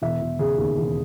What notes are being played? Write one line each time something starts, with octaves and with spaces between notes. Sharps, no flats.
E1 E5
E1
C#3 G#4
D#2
E1